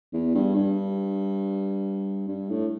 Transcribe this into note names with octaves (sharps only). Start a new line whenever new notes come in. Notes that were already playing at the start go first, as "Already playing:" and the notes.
E2
G2
G2
G2
A2